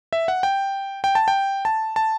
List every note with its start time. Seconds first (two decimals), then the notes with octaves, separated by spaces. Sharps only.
0.13 E5
0.28 F#5
0.43 G5
1.04 G5
1.15 A5
1.28 G5
1.65 A5
1.96 A5